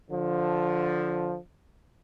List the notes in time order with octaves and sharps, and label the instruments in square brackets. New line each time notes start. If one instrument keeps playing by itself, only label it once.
[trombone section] D3 F3